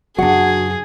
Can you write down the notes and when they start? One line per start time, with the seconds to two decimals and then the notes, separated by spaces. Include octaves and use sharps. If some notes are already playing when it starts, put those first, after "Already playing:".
0.18 F#2 C#3 F#3 D4 F#4 G#4 F#5